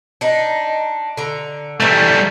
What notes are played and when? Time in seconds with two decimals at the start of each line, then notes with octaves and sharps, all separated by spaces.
0.21 D4 D#4
1.17 D3 A#5
1.80 D#3 E3 G3 A3